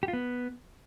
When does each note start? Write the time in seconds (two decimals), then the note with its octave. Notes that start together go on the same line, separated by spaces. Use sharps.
0.03 G4
0.08 F4
0.13 B3